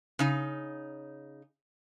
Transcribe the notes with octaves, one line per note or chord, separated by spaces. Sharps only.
C#3 D#4